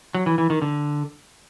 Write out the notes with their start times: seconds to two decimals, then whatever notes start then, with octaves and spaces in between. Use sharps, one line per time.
0.15 F#3
0.26 E3
0.38 E3
0.50 D#3
0.62 D3